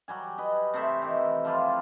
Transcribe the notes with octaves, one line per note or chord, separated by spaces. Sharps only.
F#3 G3 G#5
B4 D#5
C3 A3 C5 E5
D#3 E3
F3 G3 E4 F4